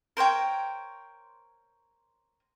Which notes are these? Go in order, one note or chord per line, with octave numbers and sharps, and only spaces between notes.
A#4 C5 C#5 G5